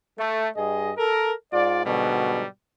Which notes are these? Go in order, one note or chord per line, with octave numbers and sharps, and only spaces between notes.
A3
G2 G#4 D#5
A4 A#4
G#2 F4 D5
G#2 B2 D3 F#3 G3